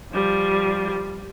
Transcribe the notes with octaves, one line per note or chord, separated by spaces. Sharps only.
F3 G3